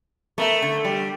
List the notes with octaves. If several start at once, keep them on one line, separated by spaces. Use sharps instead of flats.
A3 B3 A#4 E5
D3
G3